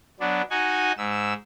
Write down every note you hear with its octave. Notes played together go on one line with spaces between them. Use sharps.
F#3 B3 D4
D#4 F#4 F#5 G#5
G#2 E6